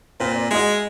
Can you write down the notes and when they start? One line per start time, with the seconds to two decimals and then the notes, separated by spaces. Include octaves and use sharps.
0.20 A#2 C4 B4 C5
0.35 D5
0.51 G#3 E4 F#4 D#5